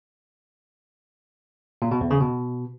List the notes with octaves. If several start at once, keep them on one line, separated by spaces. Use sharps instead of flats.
A#2
B2
E2
C#3
B2